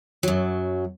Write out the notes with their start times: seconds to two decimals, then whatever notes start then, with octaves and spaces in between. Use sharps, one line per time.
0.23 F#2 F#3